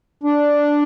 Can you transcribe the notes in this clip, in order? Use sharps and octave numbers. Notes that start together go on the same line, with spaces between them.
D4